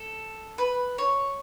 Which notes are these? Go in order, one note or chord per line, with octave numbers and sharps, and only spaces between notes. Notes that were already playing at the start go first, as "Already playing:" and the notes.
Already playing: A4
B4
C#5